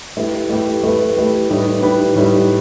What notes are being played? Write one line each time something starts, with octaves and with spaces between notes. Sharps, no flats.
A3 E4 G4 B4
A3 E4 G4 B4
A3 E4 G4 B4
A3 E4 G4 B4
A2 G3 D#4 G4 B4
A2 G3 D#4 G4 B4
A2 G3 D#4 G4 B4